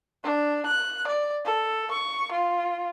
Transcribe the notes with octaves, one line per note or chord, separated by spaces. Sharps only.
D4
F#6
D5
A4
C#6
F4